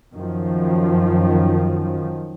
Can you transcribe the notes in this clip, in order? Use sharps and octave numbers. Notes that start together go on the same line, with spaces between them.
F#2 D#3 F3